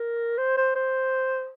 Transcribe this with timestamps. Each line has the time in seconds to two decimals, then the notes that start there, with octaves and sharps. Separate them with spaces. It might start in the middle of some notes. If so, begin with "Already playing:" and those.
Already playing: A#4
0.38 C5
0.57 C5
0.76 C5